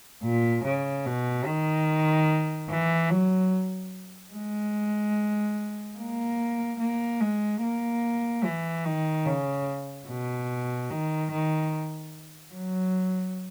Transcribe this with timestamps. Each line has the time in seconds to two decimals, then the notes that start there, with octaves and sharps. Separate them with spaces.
0.24 A#2
0.64 C#3
1.06 B2
1.46 D#3
2.70 E3
3.10 F#3
4.33 G#3
5.98 A#3
6.80 A#3
7.21 G#3
7.62 A#3
8.44 E3
8.85 D#3
9.26 C#3
10.08 B2
10.90 D#3
11.31 D#3
12.54 F#3